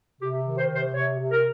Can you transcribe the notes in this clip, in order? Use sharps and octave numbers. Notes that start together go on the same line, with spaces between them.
C3 G4
D#3
C5
C3
C5
C3 C#5
C3
A#4